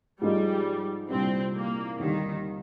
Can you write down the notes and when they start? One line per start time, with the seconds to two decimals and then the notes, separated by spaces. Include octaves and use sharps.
0.21 G#2 F3 G3 G#3 D#4 G4
1.10 C2 A#2 G3 C4 D4
1.56 A#3
1.99 D#2 D3 D#3 G3